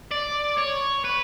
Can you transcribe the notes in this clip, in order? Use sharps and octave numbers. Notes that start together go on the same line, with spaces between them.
D5
C#5
B4